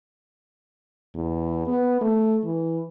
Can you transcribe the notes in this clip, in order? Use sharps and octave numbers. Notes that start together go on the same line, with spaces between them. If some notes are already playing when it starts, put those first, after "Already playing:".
E2
B3
A3
E3